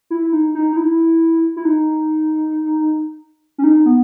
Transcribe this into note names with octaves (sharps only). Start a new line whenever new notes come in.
E4
D#4
D#4
D#4
E4
E4
D#4
C#4
D#4
B3